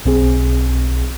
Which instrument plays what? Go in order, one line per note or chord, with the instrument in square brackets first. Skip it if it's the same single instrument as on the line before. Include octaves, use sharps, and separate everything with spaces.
[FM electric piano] B1 C4 G#4